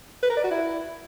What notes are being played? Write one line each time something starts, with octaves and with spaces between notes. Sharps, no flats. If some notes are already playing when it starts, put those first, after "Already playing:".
B4
A#4
D5
F#4
E4